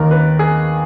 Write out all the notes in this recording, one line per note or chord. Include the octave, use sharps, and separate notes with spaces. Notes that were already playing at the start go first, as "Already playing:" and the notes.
Already playing: D#2 D#3 A#4
B4
G#4